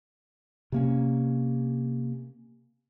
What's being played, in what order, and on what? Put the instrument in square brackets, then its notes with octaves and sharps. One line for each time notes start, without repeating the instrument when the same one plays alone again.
[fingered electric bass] C3 A#3 C#4